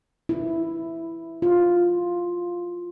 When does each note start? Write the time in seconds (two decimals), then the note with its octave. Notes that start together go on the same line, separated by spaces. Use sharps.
0.29 E4
1.42 F4